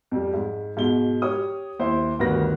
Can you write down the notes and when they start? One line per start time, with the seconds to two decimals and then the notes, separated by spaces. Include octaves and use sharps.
0.12 F2 G3
0.34 G#2
0.77 G#2 B2 G7
1.22 G4 C#5 D#6
1.79 D#2 E4 C5
2.19 G1 D2 D#3 B4 F#6 A#6